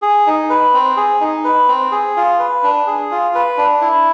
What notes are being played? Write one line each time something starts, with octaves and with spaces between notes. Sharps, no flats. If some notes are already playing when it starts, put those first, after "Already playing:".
G#4
D#4
B4
C4
G#4
D#4
B4
C4
G#4
F4
B4
D4
G#4
F4
B4
D4
E4